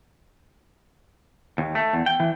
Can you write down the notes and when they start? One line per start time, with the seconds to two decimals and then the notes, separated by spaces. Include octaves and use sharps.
1.58 D#2
1.75 A3
1.93 E2
2.06 G5
2.20 E3